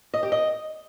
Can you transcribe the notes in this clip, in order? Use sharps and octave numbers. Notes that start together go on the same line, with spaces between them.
D#5
G4
D#5